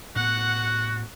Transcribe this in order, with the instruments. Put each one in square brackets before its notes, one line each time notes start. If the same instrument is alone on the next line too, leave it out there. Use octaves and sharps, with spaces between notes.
[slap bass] A2 B3 [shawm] F#4 [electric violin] F#5